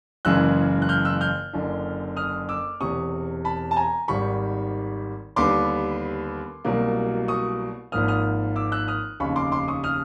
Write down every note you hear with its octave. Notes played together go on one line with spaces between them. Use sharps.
F#1 F#2 C#3 E3 G#3 E6 F#6
F#6
F6 G6
E6 F#6
F6 G6
F#1 F#2 D3
D#6 F6
D6 E6
E1 E2 C3 C#6 D#6
A5 B5
A5
G#5 A#5
G#1 G#2 D#3 G3 B5 C#6
D#2 D3 G3 B3 C6 D6
C2 B2 F#3 A#3
C#6 D#6
G#1 G#2 F3 A#3 D#6 F6
D#6 F6
D6 E6
E6 F#6
D#6 F6
F1 D#2 C#3 B5 C#6
C6 D6
C6 D6
C#6 D#6
D#6 F6